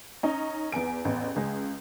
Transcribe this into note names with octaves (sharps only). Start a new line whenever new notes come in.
C#4 D#4
E2 B3 G#5 D7
A1 E2
C#2 G#3